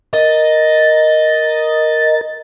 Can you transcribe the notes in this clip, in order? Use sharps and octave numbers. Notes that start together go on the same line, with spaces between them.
A#4 D#5 A6